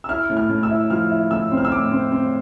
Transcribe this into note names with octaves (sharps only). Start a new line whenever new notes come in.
E6
E4 F6
A2
F6
A2
E6
E4
F3 F6
E4
A2 E6
C4
F6
E6
A2 D6
C4
C4